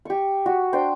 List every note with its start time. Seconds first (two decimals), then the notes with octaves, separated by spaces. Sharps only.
0.05 G4 C#6
0.46 F#4
0.73 D4 C5 G5